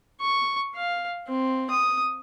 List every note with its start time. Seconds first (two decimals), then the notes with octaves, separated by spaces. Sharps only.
0.21 C#6
0.75 F5
1.27 C4
1.70 D#6